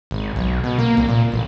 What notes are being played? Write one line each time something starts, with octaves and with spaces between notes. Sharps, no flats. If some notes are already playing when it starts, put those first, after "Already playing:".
G#1
B1
B2
A#3
C2
A#2
A1